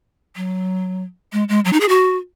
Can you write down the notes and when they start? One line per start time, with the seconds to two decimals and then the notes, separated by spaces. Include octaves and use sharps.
0.36 F#3
1.33 G#3
1.49 G#3
1.65 F#3
1.73 D#4
1.80 G#4
1.89 F#4